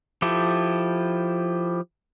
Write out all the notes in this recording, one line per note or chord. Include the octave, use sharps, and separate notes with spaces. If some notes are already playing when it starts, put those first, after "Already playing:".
F3 E4 G4 A4